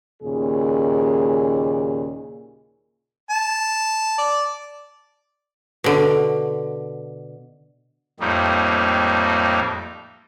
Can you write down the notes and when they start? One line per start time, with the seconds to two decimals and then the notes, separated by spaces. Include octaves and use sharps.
0.22 D#2 A#2 C#3 G#4
3.30 A5
4.18 D5
5.84 B2 D3
8.20 F2 A2 G3 A#3 D#4